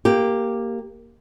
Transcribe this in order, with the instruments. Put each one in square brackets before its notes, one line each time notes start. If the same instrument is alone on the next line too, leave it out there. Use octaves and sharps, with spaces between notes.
[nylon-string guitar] A#3 G4